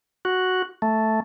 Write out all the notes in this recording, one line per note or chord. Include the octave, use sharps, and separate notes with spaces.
F#4
A3